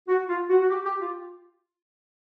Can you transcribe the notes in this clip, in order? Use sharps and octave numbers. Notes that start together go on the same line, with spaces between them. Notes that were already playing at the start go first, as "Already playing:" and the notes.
F#4
F4
F#4
F#4
G4
G4
F4